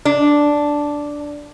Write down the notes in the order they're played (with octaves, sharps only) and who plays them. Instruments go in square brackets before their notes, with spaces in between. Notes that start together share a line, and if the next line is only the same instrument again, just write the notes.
[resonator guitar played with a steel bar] D4